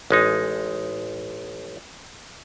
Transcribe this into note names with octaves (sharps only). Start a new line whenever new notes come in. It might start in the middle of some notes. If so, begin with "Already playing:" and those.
A1 G#3 D#4